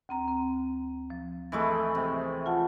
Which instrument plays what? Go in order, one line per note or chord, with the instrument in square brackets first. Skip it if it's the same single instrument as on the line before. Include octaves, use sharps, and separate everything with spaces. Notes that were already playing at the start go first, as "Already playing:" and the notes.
[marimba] D2 C4 A#5
C4
F3
[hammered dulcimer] E3 G#3 A3
C3
[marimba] F4 F#5 A5